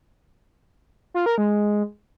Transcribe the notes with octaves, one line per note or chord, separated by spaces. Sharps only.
F4
A#4
G#3